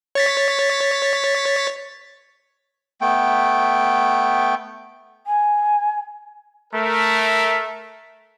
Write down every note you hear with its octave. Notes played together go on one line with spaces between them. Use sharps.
C#5 A6 B6
A3 B3 G5
G#5
A3 A#4